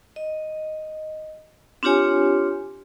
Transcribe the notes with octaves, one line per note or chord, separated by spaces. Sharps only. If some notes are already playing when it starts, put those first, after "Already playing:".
D#5
C4 D4 F4 G4 C#5 G#5